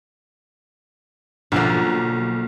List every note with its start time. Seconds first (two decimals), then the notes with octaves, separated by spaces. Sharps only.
1.52 B1 D3 F3 A#3